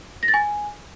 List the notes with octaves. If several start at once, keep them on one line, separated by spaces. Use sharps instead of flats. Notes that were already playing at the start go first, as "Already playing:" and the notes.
A#6
A6
G#5